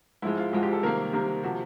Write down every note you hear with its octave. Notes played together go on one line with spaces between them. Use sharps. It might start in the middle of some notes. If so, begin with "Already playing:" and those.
G#2 F3 G#3 E4
F4
G#2 F3 G#3 F#4
G4
A4
C3 D#3 G3 A#3 A#4
C3 D#3 G3 A#3
C3 F3 F#4